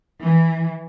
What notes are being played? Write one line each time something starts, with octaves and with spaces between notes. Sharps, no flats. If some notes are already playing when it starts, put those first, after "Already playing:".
E3